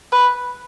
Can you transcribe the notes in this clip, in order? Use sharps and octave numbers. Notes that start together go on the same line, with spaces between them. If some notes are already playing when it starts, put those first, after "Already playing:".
B4